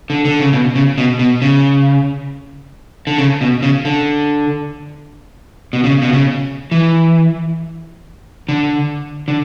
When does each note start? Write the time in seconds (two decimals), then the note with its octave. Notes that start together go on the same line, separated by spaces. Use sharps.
0.10 D3
0.25 D3
0.40 C#3
0.53 B2
0.75 C#3
0.98 B2
1.19 B2
1.42 C#3
3.07 D3
3.18 C#3
3.41 B2
3.63 C#3
3.85 D3
5.73 B2
5.84 C#3
6.02 B2
6.13 C#3
6.71 E3
8.49 D3
9.28 D3